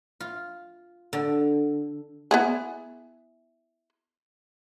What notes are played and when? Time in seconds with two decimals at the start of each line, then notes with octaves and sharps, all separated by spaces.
0.20 F4
1.13 D3
2.31 B3 E4 G#4